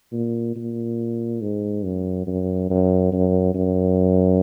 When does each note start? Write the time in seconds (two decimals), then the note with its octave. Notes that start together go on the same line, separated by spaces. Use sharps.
0.13 A#2
0.56 A#2
1.42 G#2
1.84 F#2
2.27 F#2
2.70 F#2
3.13 F#2
3.55 F#2